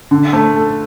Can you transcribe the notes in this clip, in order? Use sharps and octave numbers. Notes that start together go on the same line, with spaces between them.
D3
A3
A4